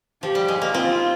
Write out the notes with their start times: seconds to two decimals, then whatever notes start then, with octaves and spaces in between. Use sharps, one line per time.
0.23 F3 G4
0.35 G3
0.48 G#3
0.62 A#3
0.74 C4 F4